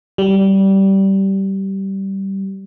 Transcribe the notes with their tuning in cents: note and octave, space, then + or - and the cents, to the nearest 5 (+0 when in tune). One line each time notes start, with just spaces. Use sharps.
G3 -15